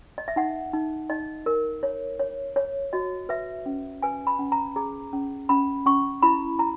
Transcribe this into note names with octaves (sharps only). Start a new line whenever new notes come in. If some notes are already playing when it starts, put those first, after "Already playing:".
D#5
E5
D#4 F#5
D#4
D#4 D#5
A#4
C#5
C#5
C#5
F#4 D#5
B4 E5
C#4
B4 G#5
B5
C#4
A#5
G#4 A#5
C#4
C#4 B5
C#4 C#6
E4 B5
E4 A#5